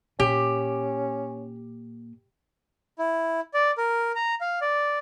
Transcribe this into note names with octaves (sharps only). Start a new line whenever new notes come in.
A#2 C#4 G4
E4
D5
A#4
A#5
F5
D5